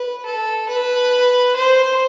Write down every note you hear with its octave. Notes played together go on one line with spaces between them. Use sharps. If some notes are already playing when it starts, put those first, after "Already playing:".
Already playing: B4
A4
B4
C5